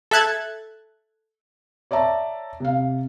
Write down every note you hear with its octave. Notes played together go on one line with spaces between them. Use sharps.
A4 E5 F#6 G#6 A6
C#5 D5 E5 A5 A#5
C3 F5